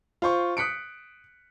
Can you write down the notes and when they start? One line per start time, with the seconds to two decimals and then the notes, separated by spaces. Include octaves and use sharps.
0.22 F4 C5 C#6
0.57 D#6 F#6 B6 C#7 D7